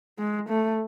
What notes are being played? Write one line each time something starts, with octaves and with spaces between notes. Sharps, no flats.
G#3
A3